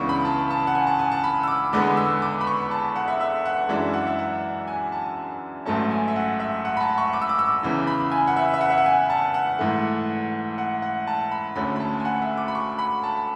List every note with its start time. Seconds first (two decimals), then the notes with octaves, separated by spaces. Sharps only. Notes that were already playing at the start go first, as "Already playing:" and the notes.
Already playing: C#2 C#3 E3 B3 D4 C#6
0.09 B5
0.25 A5
0.50 A5
0.67 F#5
0.75 G#5
0.87 A5
0.99 G#5
1.12 A5
1.24 B5
1.43 E6
1.48 D6
1.73 E2 D3 G#3 B3 D6
1.97 E6
2.22 D6
2.41 B5
2.47 C#6
2.71 A5
2.96 F#5
3.08 E5
3.21 E5
3.45 F#5
3.69 F#2 E3 G#3 D4 E5
3.93 F#5
4.07 E5
4.19 F#5
4.68 G#5
4.92 A5
5.66 A1 G#2 F#3 A3 C#4 A5
5.91 G#5
6.08 E5
6.16 F#5
6.40 E5
6.65 F#5
6.77 B5
6.81 A5
6.98 C#6
7.13 D6
7.22 E6
7.29 D6
7.39 E6
7.63 E2 C#3 E3
7.87 B5
8.12 G#5
8.27 F#5
8.36 E5
8.54 E5
8.61 F#5
8.70 E5
8.78 F#5
8.86 G#5
9.10 A5
9.34 F#5
9.59 G#2 E3 A3
10.58 F#5
10.82 F#5
11.07 A5
11.31 B5
11.56 D2 D3 A3 C#4 B5
11.76 B5
11.80 A5
12.00 G#5
12.05 F#5
12.22 E5
12.37 D6
12.48 B5
12.55 C#6
12.78 B5
13.03 A5